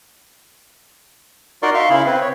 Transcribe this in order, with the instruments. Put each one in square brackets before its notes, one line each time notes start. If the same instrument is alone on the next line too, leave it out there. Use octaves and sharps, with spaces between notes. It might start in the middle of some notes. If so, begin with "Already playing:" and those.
[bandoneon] D#4 F#4 A#4 D5 C6 C#6
E5 F5 C6 C#6
C#3 E4 G#4 B5
C4 B4
C#5